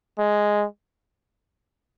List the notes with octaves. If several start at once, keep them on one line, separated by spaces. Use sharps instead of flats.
G#3